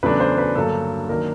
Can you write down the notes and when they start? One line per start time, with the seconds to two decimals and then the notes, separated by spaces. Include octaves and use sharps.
0.03 E2 C#3 F#3 A3 D4 B4
0.20 C5
0.38 B4
0.55 G2 D3 F#3 A#3 A4
1.09 D#3 F#3 A#3 D4 A#4